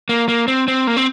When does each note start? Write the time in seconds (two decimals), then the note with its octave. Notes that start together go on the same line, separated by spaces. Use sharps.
0.09 A#3
0.28 A#3
0.48 C4
0.68 C4
0.87 A#3
0.97 C4